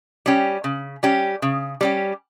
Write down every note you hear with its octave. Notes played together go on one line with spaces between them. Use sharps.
G3 C#4 G4
C#3
G3 C#4 G4
C#3
G3 C#4 G4